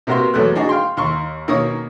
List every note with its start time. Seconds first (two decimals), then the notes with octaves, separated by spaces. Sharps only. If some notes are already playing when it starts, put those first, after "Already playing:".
0.07 C3 A#3 B3 F#4 A#4 C6
0.34 E2 F#3 A3 B3 F#6
0.55 D4 D#4 F#4 G#4
0.69 F5 G5 C6
0.97 D#2 C6 C#6
1.48 B2 D#3 A#3 C#4 C#6 D#6